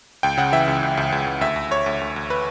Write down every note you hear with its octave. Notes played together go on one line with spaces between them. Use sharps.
C#2 G5
C#3 F#5
E3 E5
C#2
C#2
C#2
C#2
C#2
D2 E5
D2
D2 C#5
D2
D2
D2
B4